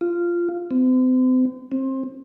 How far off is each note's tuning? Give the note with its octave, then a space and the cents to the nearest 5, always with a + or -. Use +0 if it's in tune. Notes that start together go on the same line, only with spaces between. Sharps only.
F4 -10
C4 -40
C4 +25